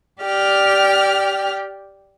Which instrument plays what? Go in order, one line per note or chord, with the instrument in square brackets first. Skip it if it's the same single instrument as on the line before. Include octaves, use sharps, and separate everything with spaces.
[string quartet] G4 D5 G5 F6